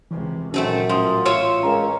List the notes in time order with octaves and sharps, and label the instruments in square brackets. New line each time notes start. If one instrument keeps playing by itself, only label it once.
[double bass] C#2 C3 [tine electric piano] E3
[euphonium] F#2 [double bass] A#2 D#3 [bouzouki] A3 C4 G#4 [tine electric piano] C#4
[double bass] A1 [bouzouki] F3 [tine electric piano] C6 D#6
[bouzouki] F4 C#5 E5
[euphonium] C#2 [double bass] C#4 [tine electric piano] A#4 A#5